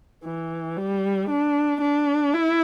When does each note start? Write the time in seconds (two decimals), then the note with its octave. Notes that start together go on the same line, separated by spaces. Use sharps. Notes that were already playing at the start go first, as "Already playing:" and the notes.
0.25 E3
0.77 G3
1.30 D4
1.81 D4
2.33 E4